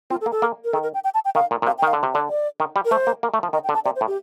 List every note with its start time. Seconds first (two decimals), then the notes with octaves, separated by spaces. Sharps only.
0.10 C4 F4
0.21 A4
0.26 A#3
0.32 A4
0.42 A#3
0.65 A#4
0.73 D#3 A4
0.83 A#4
0.94 G5
1.04 G5
1.14 A5
1.25 G5
1.35 D#3 F5
1.51 A#2
1.62 A#2
1.66 C3 F5
1.78 G5
1.82 D#3 F5
1.93 D3
2.03 C3
2.14 D3 D5
2.29 D5
2.60 D#3
2.76 G3
2.85 A#4
2.91 A3 C5
3.07 A#3
3.23 A#3
3.34 A3
3.43 F3
3.53 D#3 D#5
3.64 G5
3.69 D3
3.74 A5
3.85 C3 D5
3.96 C5
4.01 A2
4.07 G4